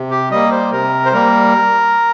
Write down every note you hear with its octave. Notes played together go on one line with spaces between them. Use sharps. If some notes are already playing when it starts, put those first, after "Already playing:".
Already playing: C3
G4
G3 A#3 D#5
C5
C3 A#4
C5
G3 A#3 A#4